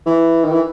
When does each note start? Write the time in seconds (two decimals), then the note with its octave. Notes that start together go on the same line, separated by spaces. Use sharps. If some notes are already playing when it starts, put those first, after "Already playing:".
0.06 E3
0.45 D#3
0.52 E3